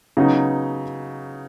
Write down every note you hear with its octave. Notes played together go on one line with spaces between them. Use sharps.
C#3 F#3 B3 D#4